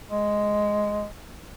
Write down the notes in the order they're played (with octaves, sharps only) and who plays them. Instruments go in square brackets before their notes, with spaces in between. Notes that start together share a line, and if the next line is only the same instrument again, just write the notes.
[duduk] G#3